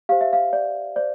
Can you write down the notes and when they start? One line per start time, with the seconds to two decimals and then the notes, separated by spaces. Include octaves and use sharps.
0.09 G4 C5 F5
0.21 E5
0.33 F5
0.53 D5
0.96 C5 D5